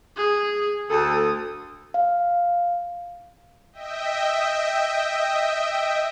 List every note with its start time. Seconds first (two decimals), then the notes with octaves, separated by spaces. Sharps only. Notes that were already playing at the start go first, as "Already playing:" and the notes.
0.17 G#4
0.90 D2 A4 D#6
1.94 F5
3.73 D#5 E5 G5